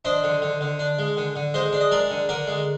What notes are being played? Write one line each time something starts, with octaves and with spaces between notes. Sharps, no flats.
D4 C5 D#5
D3
D3
D3
D4
G#3
D3
D3
G#3 C5 D#5
D4
D#5
G#3 A#4 D5
D3
D3 A#4 D5
G#3